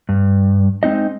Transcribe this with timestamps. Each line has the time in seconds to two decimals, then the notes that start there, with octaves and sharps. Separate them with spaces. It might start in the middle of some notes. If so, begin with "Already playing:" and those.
0.09 G2
0.83 G#3 C4 D#4 D#5